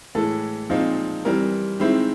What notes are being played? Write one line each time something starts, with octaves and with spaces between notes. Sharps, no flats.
A2 E3 G#3 A4
A#2 F3 G#3 C4 D#4
E3 G3 C4 A#4
D#3 G#3 C4 E4